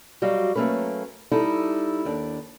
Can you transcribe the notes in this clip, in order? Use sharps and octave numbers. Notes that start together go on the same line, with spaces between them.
F#3 G3 F#4 D#5 F5
F#3 A3 A#3 C#4 B4
G3 D#4 E4 A4
D#2 D4